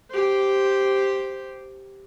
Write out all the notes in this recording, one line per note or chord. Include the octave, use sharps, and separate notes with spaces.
G4 C5